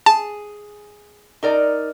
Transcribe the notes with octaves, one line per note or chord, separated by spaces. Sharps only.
G#4 A5
D#4 A#4 D5